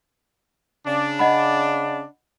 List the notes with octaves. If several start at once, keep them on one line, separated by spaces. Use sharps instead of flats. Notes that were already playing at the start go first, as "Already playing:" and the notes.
C#3 D4
D#5 F#5 B5